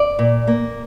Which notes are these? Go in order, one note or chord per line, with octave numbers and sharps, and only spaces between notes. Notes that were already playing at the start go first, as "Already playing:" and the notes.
Already playing: D5
A#2
A#3